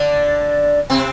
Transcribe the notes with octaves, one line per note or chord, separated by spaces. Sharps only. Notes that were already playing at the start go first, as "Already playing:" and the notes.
Already playing: D3 D4
C3 C4